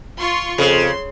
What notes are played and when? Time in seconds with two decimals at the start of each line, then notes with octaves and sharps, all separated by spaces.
0.18 F4 C6 C#6
0.58 F2 C#3 C6